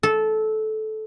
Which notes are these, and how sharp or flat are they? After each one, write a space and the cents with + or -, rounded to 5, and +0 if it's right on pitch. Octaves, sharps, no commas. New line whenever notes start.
A4 -15